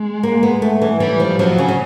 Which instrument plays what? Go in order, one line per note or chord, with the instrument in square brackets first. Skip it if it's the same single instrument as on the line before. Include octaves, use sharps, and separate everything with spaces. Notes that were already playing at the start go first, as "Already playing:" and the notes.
Already playing: [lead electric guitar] G#3
[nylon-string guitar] A#3
B3
A3
E3
[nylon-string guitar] E3 [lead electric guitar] G3
[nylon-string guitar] F3
[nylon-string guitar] F3 [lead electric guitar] F#3
[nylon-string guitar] C#3
C#3